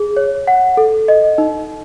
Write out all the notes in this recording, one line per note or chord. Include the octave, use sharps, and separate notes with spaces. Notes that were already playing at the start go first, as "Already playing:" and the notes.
Already playing: G#4
C#5
F#5
A4
D#5
D#4